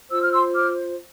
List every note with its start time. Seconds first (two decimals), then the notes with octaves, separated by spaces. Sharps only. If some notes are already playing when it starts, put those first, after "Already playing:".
0.10 F4 C5 E6
0.22 F6
0.33 C6 E6
0.54 D6 F6